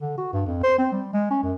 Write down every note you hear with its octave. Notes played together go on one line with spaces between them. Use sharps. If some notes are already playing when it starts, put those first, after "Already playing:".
D3
F#4
G2
F2
C5
C4
G3
G#3
C#4
F#2